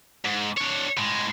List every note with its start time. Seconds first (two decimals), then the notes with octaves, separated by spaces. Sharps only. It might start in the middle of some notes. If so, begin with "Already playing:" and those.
0.25 G#2
0.57 D4 C#5
0.97 A2 G#3